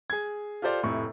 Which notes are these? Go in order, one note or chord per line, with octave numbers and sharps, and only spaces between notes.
G#4 G#6
F4 G4 A4 C5 D5 F5
F1 A2 C3 C#6